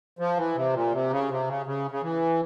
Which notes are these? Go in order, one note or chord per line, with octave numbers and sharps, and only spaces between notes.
F3
E3
C3
A#2
C3
C#3
C3
C#3
C#3
C#3
E3